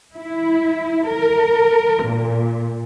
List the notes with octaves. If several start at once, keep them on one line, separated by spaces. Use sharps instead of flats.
E4
A#4
A#2